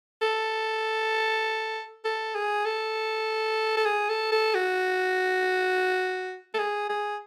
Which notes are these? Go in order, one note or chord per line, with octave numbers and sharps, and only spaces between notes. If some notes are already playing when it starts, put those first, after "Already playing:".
A4
A4
G#4
A4
A4
G#4
A4
A4
F#4
A4
G#4
G#4